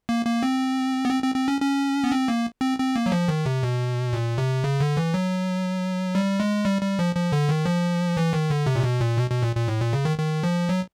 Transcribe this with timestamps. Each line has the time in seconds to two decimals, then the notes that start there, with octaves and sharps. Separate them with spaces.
0.09 A#3
0.26 A#3
0.43 C4
1.05 B3
1.10 C4
1.23 C4
1.35 C4
1.48 C#4
1.61 C#4
2.04 B3
2.12 C4
2.28 A#3
2.61 C4
2.79 C4
2.96 A#3
3.06 F#3
3.12 F3
3.28 D#3
3.46 C3
3.63 B2
4.13 A#2
4.38 C3
4.64 C#3
4.81 D3
4.97 E3
5.14 F#3
6.15 G3
6.40 G#3
6.65 G3
6.82 G3
6.99 F3
7.15 F3
7.32 D3
7.49 D#3
7.66 F3
8.17 E3
8.33 D#3
8.50 D3
8.66 C3
8.75 A#2
8.84 B2
9.01 A#2
9.18 B2
9.30 B2
9.43 A#2
9.55 A#2
9.68 A2
9.81 A#2
9.93 C#3
10.05 D#3
10.18 D#3
10.43 F3
10.69 F#3